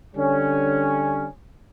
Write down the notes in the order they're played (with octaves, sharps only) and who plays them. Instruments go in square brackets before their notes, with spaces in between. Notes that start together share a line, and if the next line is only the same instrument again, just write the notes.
[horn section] D3 G3 C#4